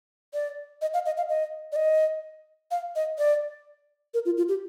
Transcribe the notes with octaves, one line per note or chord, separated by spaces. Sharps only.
D5
D#5
F5
D#5
F5
D#5
D5
D#5
F5
D#5
D5
A#4
F4
F4
G4